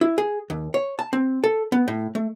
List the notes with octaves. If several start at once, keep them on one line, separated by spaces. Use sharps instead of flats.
E4
G#4
D#2
C#5
A5
C4
A4
B3
A2
A3